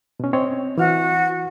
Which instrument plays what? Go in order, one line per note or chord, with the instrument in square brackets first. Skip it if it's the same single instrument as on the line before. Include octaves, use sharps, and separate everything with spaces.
[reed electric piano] B2 C#4
C4 C#5 D#5
[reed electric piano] E3 F6 [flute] F#4